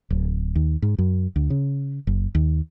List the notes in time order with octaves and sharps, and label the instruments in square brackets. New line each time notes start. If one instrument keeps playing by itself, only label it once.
[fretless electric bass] D1
D#2
G#2
F#2
D2
C#3
F#1
D#2